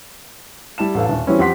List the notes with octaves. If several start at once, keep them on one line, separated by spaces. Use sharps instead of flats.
G3 E4 A5 E7
A1 A4 F5
D#1 A5
E3 F#3 G3 C4 C#4 E4
F2 G4 F#5 C6 B6